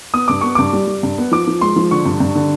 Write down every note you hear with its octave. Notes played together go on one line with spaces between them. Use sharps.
B3 D#6
G2 D6
B3 C#6
G2 D6
G3
G3
G2
B3
F3 D6
F3
G#3 C6
F3
D3 C#6
G2
G2
D3